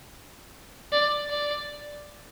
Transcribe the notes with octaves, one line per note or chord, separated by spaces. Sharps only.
D5
D5